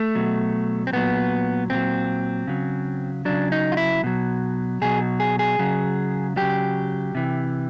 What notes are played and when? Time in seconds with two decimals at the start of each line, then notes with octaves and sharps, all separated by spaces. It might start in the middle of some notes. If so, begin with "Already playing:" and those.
Already playing: A3
0.15 B2 F#3
0.87 C4
0.93 A#2 F#3 B3
1.70 A#2 F#3 C4
2.47 C#3 F#3
3.25 C#3 F#3 D4
3.52 D#4
3.72 F4
3.77 E4
4.04 B2 F#3
4.82 B2 F#3 G#4
5.20 G#4
5.39 G#4
5.59 C#3 F#3
6.37 C#3 F#3 G4
7.15 C3 E3